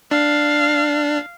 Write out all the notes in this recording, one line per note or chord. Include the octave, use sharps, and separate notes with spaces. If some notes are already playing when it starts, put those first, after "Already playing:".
D4 F5